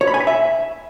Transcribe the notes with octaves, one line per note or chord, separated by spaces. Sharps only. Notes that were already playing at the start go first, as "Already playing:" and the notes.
C#5
B5
G#5
B5
E5